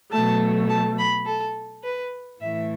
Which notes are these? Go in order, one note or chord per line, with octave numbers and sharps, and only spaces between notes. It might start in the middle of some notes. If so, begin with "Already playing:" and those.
B2 F#3 A3 A5
A5
B5
A4
B4
A2 E3 A3 E4 E5